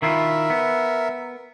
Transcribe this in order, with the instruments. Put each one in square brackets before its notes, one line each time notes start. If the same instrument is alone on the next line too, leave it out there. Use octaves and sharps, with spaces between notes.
[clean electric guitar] D#3 E4 F4 [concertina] A#4 E5
[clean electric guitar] B3